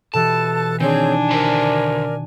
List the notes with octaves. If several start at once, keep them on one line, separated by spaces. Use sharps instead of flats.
B2 E3 G4 A4 A5 F#6
D#3 C4 D4 G#4 C#5 G#5 G6
D3 A#4 C5 D5 A#5
G#6